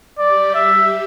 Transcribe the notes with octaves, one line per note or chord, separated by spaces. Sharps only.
G3 G4 D5
E5